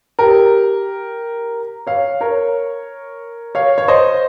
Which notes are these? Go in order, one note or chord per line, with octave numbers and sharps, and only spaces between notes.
G4 A#4
C#5 F5
A#4 C#5
C#5 F5
C#5
C5 D#5